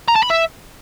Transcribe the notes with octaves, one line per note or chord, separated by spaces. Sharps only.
A#5
A5
B5
E5